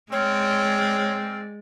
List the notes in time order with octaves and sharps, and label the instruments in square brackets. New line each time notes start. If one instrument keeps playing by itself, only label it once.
[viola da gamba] G#3 D5 [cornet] C4 [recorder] C#5 [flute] F6